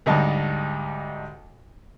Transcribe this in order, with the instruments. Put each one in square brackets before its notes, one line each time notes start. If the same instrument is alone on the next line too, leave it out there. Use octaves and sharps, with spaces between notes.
[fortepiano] D2 G#2 G3 D#4 G4 A5